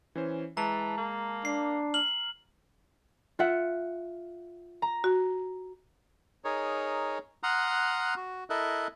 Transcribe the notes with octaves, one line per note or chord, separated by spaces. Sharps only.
E3 C#4 C5
E3 G#3 A5 A#5
A#3
D4 C7
F6 F#7
F4 E5 F#5
A#5
F#4
D#4 G#4 A#4 C#5
F#5 A#5 C6 D#6 F6 F#6
F#4
E4 A4 A#4 D#5 E5 F#6